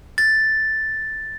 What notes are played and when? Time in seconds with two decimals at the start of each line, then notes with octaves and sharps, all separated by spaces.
0.18 A6